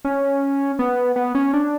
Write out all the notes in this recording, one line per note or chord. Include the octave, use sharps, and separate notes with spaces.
C#4
B3
B3
C#4
D4